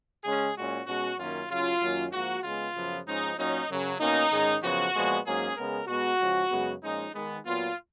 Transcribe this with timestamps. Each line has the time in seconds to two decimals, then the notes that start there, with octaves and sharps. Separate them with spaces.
0.24 C#3 G#3 C#4 G#4
0.56 A#2 G#3 C#4 F#4
0.87 B2 G#3 C#4 F#4
1.18 F#2 D#3 A#3 C#4 F4
1.50 C#3 F#3 C#4 F4
1.82 F#2 D#3 F#3 A#3 C#4
2.12 G#2 F3 A#3 F#4
2.44 C#3 G#3 B3 F4
2.75 F#2 C#3 F3 B3
3.07 G#2 F3 G#3 C#4 D#4
3.38 A#2 F#3 A#3 C#4 D#4
3.69 F#2 C#3 F#3
4.00 B2 A#3 C#4 D#4
4.31 G#2 D#3 G#3 C#4
4.63 F#2 C#3 F3 B3 F#4
4.95 A#2 F3 G#3 B3
5.25 G#2 F#3 A#3 C#4 G#4
5.57 C#3 G#3 B3 A#4
5.88 B2 G#3 B3 F#4
6.19 C#3 F3 G#3
6.51 F#2 C#3 G#3 B3
6.82 A#2 F3 G#3 C#4 D#4
7.13 D#3 G#3 B3
7.45 A#2 F#3 B3 F4